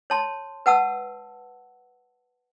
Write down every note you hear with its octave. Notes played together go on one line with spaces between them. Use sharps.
C#5 A5 C6
B4 F#5 A5 E6